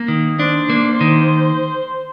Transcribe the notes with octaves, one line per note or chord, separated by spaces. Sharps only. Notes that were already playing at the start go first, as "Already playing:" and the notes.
Already playing: A#3
D#3
D4 C5
A#3
D#3